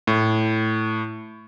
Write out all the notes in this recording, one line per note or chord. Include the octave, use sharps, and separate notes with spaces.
A2